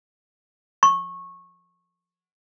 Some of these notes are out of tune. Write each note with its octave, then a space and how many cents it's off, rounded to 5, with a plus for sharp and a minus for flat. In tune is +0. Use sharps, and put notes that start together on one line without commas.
C#6 -20